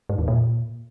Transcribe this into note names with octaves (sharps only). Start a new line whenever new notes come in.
G#2
E2
A#2